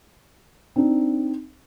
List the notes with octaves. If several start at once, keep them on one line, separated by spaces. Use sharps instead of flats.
C4 D4 D#4